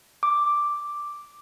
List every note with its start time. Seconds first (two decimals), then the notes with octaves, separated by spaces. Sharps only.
0.23 D6